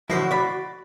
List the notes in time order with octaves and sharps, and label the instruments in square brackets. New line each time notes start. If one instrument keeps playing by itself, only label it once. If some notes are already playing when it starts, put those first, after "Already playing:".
[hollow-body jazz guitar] A2 D3 E4 [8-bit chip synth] F3 A#6 C7 [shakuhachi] F#4
[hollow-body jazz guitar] D5 B5